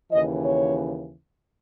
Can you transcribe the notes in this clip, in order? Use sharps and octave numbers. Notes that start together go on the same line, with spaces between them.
D#2 C#3 E3 D#5
C#5